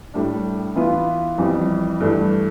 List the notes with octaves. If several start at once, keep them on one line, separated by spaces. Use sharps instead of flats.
A2 G3 D4
E3 B3 F4 B4
F2 E3 G3
G2 E3 A3